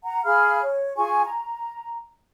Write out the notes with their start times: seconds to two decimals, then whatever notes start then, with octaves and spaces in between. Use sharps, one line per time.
0.03 F#5 A#5
0.25 G#4 F5 B5 F6
0.62 C#5
0.97 F4 G#4 G#5 C#6
1.25 A#5